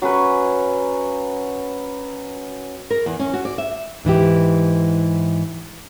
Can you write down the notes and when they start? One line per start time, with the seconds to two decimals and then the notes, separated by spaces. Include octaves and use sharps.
0.02 F#3 C#4 B4
2.90 A#4
3.06 E2
3.19 C#4
3.34 F#4
3.45 D5
3.58 E5
4.05 G#2 E3 E4 G4